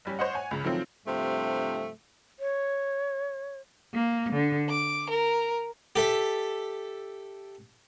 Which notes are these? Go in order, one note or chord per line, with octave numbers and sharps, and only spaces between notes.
F#1 G3 C#4
C5 C#5 D#5 F#5
C#5 F#5 G#5
C#2 C#3
D#3 F3 F#3 A3 C4 F4
G2 C3 F3 A3
C#5
A#3
D3
D6
A#4
G4 A4 E5